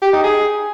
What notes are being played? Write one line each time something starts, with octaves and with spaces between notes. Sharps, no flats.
G4
D#4
G#4